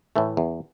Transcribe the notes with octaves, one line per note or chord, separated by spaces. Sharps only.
A2 E3 A3
E2